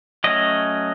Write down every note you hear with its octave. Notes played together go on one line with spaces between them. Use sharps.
F#3 A3 C#4 D#5